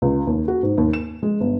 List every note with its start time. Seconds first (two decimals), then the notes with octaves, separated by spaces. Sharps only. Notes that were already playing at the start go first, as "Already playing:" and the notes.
0.02 C#2
0.27 D#2
0.48 F#4
0.63 G#2
0.78 D#2
0.93 E7
1.23 G#3
1.40 G1